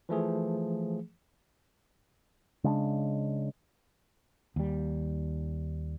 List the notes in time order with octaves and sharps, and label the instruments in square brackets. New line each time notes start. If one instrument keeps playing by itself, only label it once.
[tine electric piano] E3 F3 A3 G#4
[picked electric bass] C#3 G#3 C#4 D4
[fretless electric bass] D#2 G3